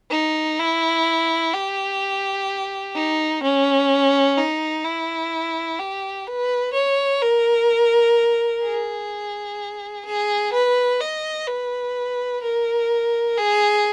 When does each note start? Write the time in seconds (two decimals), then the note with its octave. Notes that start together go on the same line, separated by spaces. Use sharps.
0.10 D#4
0.59 E4
1.54 G4
2.95 D#4
3.43 C#4
4.37 D#4
4.84 E4
5.79 G4
6.27 B4
6.73 C#5
7.22 A#4
8.64 G#4
10.05 G#4
10.53 B4
11.00 D#5
11.47 B4
12.42 A#4
13.37 G#4